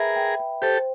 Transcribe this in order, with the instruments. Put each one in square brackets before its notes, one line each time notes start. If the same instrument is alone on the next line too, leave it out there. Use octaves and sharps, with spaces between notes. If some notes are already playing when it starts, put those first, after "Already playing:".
Already playing: [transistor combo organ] G#4 A#4 [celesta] B4 E5 G5 B5
[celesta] G5
G5
[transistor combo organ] G4 A4 [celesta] C5